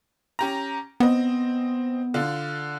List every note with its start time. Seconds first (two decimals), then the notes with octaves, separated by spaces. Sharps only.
0.39 C#4 G4 A#5
1.00 B3 C4 D#5
2.14 D3 D4 F4